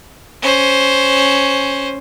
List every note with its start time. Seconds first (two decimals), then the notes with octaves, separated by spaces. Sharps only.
0.42 C#4 C5